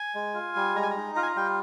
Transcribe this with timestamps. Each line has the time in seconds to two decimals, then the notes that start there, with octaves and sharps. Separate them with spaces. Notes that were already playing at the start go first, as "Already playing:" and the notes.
Already playing: G#5
0.15 G#3
0.34 F4
0.56 G3
0.75 G#3 A#5
0.83 G#5
0.90 A#5
0.96 D#4
1.16 F4 A#5
1.23 G#5
1.26 A#5
1.36 G3 G5